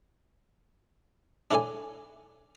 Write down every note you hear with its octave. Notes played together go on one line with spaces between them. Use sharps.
D4 E4 A4 C#5 D5 G#5